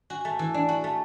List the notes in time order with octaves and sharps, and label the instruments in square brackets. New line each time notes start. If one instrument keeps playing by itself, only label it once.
[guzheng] F#4 [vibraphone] G#5
[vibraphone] G#5
[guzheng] A3 [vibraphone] A5
[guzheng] E3 [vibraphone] G#5
[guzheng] D4
F#4
A3